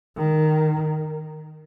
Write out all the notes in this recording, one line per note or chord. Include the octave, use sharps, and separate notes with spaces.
D#3